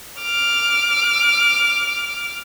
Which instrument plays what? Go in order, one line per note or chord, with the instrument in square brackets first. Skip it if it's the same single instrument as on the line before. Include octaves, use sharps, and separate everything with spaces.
[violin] D6 F6